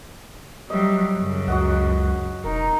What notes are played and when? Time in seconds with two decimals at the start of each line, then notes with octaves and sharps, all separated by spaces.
0.70 F#3 G3 D#5 E5
1.18 F#2 C#3
1.48 C#2 F#4 D#5 F#5
2.44 E1 D#4 A#4